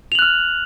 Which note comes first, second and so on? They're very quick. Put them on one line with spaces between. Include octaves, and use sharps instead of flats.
F7 F#7 F#6 F6